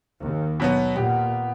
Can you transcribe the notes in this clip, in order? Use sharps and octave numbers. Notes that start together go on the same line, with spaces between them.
D#2
B2 F#3 B3
A#2 B3 G4